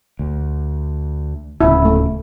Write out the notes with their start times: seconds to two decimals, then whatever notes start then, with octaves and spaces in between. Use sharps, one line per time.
0.19 D2
1.61 D1 D2 C#3 E4
1.85 A3